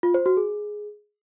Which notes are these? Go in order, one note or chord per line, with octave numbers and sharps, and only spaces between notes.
F4
C5
F#4
G#4